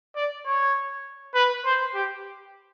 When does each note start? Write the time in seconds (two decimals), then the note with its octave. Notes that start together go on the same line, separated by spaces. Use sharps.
0.16 D5
0.46 C#5
1.34 B4
1.65 C5
1.94 G4